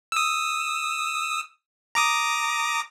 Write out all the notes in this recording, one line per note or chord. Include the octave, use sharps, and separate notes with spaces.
D#6 E6
A#5 D6 D#6